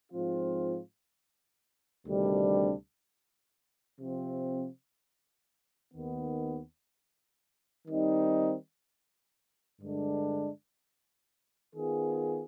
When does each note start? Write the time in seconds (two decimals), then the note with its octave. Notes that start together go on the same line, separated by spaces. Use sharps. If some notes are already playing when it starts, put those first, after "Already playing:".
0.12 G#2 F3 C4 F4
2.06 D2 C3 D#3 G3 D4
4.00 C3 F3 C4
5.93 D#2 D#3 B3
7.87 D#3 G3 C4 D#4
9.82 G2 D3 G#3 D4
11.75 D#3 B3 F4 G#4